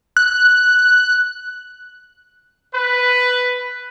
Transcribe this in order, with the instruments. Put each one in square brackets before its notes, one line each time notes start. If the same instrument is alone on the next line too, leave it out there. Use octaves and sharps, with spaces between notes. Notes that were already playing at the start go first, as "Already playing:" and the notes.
[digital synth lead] F#6
[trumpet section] B4